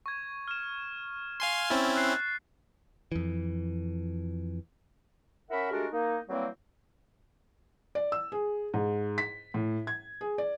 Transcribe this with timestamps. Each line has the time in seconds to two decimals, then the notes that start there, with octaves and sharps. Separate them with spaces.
0.06 C#6 G#6
0.48 F6 E7
1.40 F5 G#5 C6
1.70 C4 C#4 E4 A6
1.96 F#6 C7
3.12 F2 E3
5.50 C#4 E4 A#4 E5 F#5 B5
5.71 G#3 A3 D4 F#4 G4 A#4
5.92 A#3 D#4
6.29 E3 F#3 G3 A#3 C4
7.95 D5
8.12 E6
8.32 G#4
8.74 G#2
9.18 B6
9.54 A2
9.87 G#6
10.21 G#4
10.38 D5